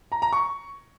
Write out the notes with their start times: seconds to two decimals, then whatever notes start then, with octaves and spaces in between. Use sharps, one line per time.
0.12 A#5
0.22 A#5
0.33 C#6